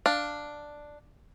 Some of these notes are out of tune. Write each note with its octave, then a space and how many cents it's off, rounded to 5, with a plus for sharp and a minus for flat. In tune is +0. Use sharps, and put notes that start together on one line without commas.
D4 +5 F5 +0